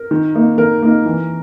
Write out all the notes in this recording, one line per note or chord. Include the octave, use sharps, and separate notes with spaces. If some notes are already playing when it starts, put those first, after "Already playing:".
Already playing: A#4
D#3
A#3 D#4
D#3 A#4
A#3 D#4
E3